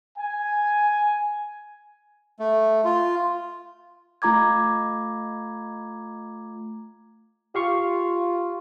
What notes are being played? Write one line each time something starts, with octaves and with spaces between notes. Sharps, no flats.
G#5
A3
F4
A3 F4 A#5 D6 G#6
F4 G4 F5 C#6